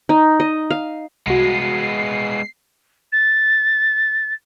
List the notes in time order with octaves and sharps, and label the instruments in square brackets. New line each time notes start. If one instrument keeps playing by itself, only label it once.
[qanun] D#4
D#5
F5
[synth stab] C2 F#4 [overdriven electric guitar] G#3 B3 [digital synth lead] C7
[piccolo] A6